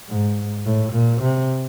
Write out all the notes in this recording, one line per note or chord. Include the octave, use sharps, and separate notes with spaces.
G#2
A2
A#2
C3